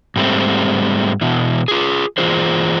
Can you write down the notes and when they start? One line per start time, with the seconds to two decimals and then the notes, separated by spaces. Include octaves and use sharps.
0.16 G#2 G3 A3 C4
1.21 B2 E3
1.68 F4 G#4
2.18 E3 F4 G#4 C5